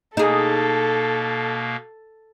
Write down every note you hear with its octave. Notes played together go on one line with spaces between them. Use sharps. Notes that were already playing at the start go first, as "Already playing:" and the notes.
B2 A#3 D#4 G#4 A4